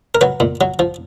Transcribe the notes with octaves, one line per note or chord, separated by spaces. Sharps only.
A#4
F#3 B4
A#2
F#3
F3